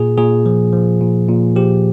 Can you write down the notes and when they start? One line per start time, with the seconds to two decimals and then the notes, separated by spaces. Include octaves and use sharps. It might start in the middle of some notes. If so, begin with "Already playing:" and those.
Already playing: A#2 G#4
0.18 A#2 G#4
0.46 F3
0.73 F3
1.01 A#2
1.28 A#2
1.56 F3 G4